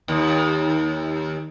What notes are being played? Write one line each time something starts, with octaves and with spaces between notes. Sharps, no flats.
D#2